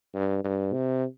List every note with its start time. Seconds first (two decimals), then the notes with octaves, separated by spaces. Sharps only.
0.14 G2
0.44 G2
0.73 C3